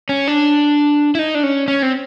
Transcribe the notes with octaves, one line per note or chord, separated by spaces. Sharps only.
C#4
D4
E4
D#4
D4
C#4
C#4
C4